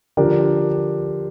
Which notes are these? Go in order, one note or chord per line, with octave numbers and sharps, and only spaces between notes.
D3 F3 D4 G4 A#4